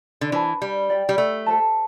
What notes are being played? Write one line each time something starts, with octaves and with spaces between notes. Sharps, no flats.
D3
E3 D4 C5 A5
G3
G4 D5 G5
G3
A3
A4 C5 A5